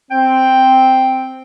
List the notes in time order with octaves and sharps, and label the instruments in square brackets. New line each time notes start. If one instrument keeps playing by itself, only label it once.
[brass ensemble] C4 [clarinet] G5